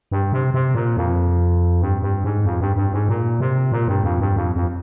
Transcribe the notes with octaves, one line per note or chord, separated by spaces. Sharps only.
G2
C3
C3
A#2
F2
G2
G2
G#2
F2
G2
G2
G#2
A#2
C3
A#2
G2
F2
G2
F2
F2